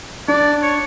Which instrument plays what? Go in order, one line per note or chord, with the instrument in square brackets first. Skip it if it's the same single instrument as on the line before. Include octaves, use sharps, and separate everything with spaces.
[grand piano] D4 [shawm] D5
[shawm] C#5